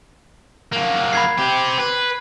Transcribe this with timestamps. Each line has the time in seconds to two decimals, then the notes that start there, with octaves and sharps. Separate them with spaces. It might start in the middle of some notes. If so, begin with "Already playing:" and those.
0.73 F#3 A#3
1.13 B5 G#6 C7
1.38 C4 G4
1.79 B4